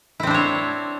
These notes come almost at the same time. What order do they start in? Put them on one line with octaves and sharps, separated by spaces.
E4 C4 D4 C5 C#5